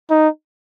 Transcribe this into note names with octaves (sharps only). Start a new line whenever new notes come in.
D#4